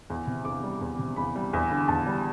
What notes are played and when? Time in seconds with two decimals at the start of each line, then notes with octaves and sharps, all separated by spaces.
0.10 E2
0.27 C3
0.45 E2 D6
0.64 G3
0.81 E2
0.99 C3
1.16 E2 B5
1.35 G3
1.53 E2
1.71 D3
1.88 E2 A5
2.06 G3